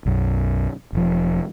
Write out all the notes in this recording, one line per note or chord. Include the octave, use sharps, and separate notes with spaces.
B1 F#2
E1 F3